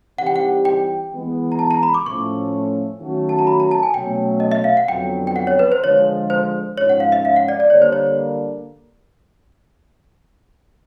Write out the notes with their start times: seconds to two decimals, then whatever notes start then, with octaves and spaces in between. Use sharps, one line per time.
0.18 E3 G3 C4 D#4 G4 F#5
0.27 G5
0.36 F#5
0.65 G5
1.12 E3 G#3 B3
1.52 A#5
1.59 A5
1.71 A#5
1.83 B5
1.94 D6
2.06 A2 F3 A3 C#4 C#6
3.00 D#3 F#3 A3 C#4 F#4
3.29 A5
3.39 A#5
3.47 B5
3.60 A#5
3.71 A5
3.83 G#5
3.94 B2 F#3 A3 C#4 G5
4.40 D#5
4.52 E5
4.64 F5
4.77 F#5
4.88 F2 D3 F#3 B3 G5
5.27 G5
5.36 F#5
5.47 C#5
5.59 B4
5.72 C5
5.83 D3 F3 G#3 C#5
6.30 C5
6.77 G#2 F3 G#3 C#4 C#5
6.90 F#5
7.00 F5
7.12 E5
7.25 F5
7.36 F#5
7.48 D5
7.60 D5
7.70 D3 G3 A#3 D4 C#5
7.82 C5
7.93 C#5